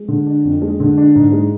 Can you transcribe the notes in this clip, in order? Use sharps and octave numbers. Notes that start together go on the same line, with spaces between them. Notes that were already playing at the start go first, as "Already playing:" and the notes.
Already playing: G#3
D3
D4
F2
G#3
D3
D4
G#2
G#3